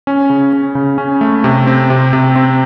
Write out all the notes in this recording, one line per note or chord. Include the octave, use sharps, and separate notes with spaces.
C#4
C#3
C#4
C#3
C#4
A3
C3
C4
C3
C3
C4